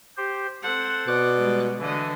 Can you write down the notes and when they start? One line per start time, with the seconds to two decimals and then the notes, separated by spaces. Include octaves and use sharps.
0.17 G4 C5
0.63 C4 A4 C5 F#5
1.08 B2 D5 D6 F#6
1.37 G3 G#3
1.79 D3 E3 D#5